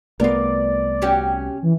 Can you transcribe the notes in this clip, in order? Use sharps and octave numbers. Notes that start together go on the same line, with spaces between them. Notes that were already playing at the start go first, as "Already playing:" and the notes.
C2 A3 B3 F4 A#4 D5
C#4 F#4 G4
E3